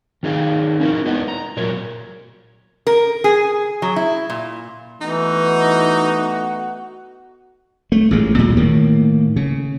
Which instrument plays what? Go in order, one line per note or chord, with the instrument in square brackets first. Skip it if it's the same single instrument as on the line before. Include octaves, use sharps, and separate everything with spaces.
[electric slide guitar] D#3 D#4 G#4 B4 F5 G5
C#4 D#4 E4 A#4
G#3 B3 E4 B4 D#5
A#5
A#2 F#3 A#4 C#5
[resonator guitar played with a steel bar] A#4
G#4
F#3
E4
A#2
[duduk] E3 [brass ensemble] A3 B3 F#4 [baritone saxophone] D#4
[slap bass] A3
A1 A#2 G#3
D1 D2 A#2 G3
A2 D#3 A#3
C#3